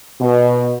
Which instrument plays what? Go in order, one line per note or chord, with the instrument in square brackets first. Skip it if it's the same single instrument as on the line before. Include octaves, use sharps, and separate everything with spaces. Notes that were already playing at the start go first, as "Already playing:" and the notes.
[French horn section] B2